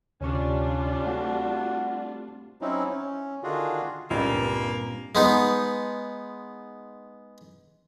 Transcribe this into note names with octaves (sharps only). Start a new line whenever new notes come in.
D2 C3 G3 C#4 D4 F4 C#6
A3 C4 F#4
F#3 C4 C#4 D#4 E4
C#4
D3 D#3 D4 F4 F#4 G#4
C#2 G2 A#2 G3 A#3 C4
G#3 B3 D#4